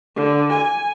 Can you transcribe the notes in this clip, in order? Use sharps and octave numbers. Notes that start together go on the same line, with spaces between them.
D3
G#5